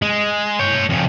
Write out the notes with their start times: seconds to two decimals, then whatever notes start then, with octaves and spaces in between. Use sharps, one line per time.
0.02 G#3
0.59 C#5 G5
0.89 F2 C#3